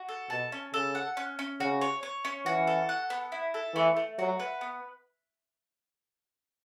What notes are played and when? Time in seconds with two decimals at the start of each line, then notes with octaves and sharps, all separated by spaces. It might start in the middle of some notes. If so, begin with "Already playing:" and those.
Already playing: F#4
0.09 A4
0.30 B2 A5
0.52 C#4
0.73 C#3 A4
0.95 F#5
1.17 C#4
1.39 C#4
1.60 C#3 F#4
1.82 C#5
2.03 C#5
2.25 C#4
2.46 E3 F#4
2.67 A4
2.89 F#5
3.10 B3
3.32 E4
3.54 A4
3.75 E3 A3
3.97 A3
4.18 F#3 F#4
4.39 B4
4.61 B3